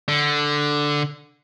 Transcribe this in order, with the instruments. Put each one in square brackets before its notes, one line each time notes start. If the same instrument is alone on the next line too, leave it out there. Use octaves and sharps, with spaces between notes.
[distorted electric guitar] D3